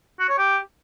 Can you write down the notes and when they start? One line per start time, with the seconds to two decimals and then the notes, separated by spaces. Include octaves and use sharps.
0.19 F#4
0.29 C#5
0.38 G4